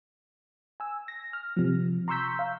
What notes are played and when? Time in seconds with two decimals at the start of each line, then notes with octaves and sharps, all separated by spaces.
0.80 G#5 E6
1.08 A#6
1.33 F6
1.56 C3 F3
2.08 A#5 C6 C#6 E6 G6 B6
2.39 F5